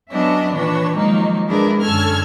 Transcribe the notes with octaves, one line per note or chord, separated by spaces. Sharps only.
F#3 B3 C#4 D4 D#5 E5
A#2 D#3 E3 D4 B4 C#5
D#3 F3 F#3 G#3 A#3 D#4
G#3 D4 E4 G#4 A#4 B4
F#2 D3 C#4 A4 F6 G#6